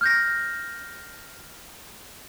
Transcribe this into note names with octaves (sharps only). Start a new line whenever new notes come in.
F6 G6 A#6